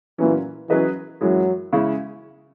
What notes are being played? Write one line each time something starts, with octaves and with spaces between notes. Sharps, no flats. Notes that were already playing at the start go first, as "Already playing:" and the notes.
A#2 E3 F#3 C#4
E3 F#3 C#4 G#4 B4 D#5
F#2 E3 F#3 G#3
C#3 G#3 C#4 E4